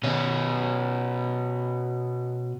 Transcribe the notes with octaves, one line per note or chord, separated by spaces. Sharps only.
B2 C#4